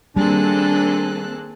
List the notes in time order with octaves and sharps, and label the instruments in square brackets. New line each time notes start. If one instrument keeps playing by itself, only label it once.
[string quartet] D#3 G#4 F#6 [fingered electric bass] G3 [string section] A#3 C4 A4 [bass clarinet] D4